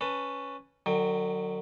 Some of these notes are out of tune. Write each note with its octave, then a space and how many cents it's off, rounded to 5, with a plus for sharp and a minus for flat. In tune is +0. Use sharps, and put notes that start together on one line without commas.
C#4 +0 B4 +0 A5 +20
D3 +45 F#3 +0 G5 +30